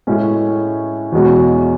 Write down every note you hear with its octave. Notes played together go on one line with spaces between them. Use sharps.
A2 G#3 C#4
E2 B2 G#3 C#4